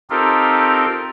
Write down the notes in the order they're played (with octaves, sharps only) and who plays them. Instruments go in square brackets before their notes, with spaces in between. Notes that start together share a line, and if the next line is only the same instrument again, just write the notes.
[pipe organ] C4 D#4 F4 G4 A4 A#4